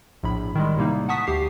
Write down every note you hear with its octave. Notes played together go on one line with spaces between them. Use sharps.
A#1 A2 B5
D#3 G3 G#3
A2 C3 G3 A#3 D#4
F#5 A5 C#6 D#6 B6
D2 G4 C7